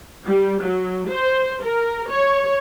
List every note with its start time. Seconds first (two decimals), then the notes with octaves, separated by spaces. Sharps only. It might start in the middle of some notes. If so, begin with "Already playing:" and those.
0.24 G3
0.61 F#3
1.09 C5
1.62 A#4
2.08 C#5